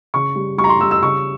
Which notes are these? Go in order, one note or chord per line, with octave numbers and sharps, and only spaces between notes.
C#3 C#6
G3
G3 C#6
A#5
C6
G3 E6
E6
C#3 C#6